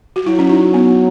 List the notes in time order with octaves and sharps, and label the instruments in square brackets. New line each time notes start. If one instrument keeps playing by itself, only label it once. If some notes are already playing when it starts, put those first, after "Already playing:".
[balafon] F#4
[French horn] F#3 [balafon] E4
[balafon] C#4
D#4
B3